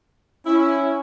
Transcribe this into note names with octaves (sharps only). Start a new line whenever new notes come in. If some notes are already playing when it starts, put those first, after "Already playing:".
C#4 E4